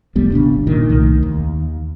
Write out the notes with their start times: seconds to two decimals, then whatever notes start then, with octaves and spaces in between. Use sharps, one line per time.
0.15 E1 D2 G3 B3
0.32 G#1 C#3 B3 D4
0.67 A#2 D#3
0.89 C2 D#3 A3
1.23 D#2